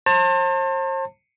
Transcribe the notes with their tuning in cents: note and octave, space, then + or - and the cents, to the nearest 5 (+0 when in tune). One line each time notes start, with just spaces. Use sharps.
C5 +40 A5 +35